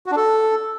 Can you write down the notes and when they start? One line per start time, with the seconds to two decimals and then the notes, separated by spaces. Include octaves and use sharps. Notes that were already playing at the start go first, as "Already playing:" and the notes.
0.06 F#4
0.11 D4
0.16 A4